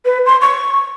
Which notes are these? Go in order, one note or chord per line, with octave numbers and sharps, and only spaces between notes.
B4
C6
C#6